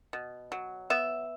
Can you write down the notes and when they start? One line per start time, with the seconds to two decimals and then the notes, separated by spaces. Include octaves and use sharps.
0.13 B2
0.52 F#3
0.90 B3 E5